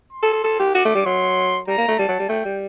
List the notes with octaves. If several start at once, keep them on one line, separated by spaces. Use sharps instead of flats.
C6
A4
A4
A4
G4
F#4 D6
A3
G3
F#3 C6
G3 A#5
A#3
A3
G3 A5
F#3
G3
A3 G5
G3